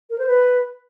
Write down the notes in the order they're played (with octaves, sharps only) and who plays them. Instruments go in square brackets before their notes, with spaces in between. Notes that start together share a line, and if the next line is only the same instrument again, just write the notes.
[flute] A#4
C5
B4